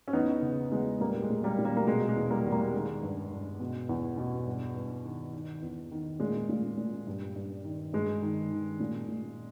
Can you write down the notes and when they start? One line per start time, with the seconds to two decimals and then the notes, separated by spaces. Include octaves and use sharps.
0.08 C#4
0.13 E2 B3 D#4
0.42 C#3
0.71 E2 G#3 B3
1.00 A#2 G3 A#3
1.22 G#3
1.30 A#2
1.44 G3 A#3
1.58 A#2
1.65 G3 A#3
1.77 A#3
1.87 B2 G#3
2.09 G#3
2.16 E2
2.30 G3 A#3
2.45 E2
2.52 G3 A#3
2.74 D#3 G#3
3.03 G2
3.32 G2
3.60 B2
3.89 E2
4.18 B2
4.46 G2
4.76 G2
5.04 D#3
5.33 D#3
5.62 E2
5.91 D#3
6.20 A#2 G#3
6.49 A#2
6.77 A#2
7.07 G2 G3
7.36 G2
7.64 D#3
7.93 G2 G#3
8.22 D#3
8.52 D#3
8.80 A#2
9.08 A#2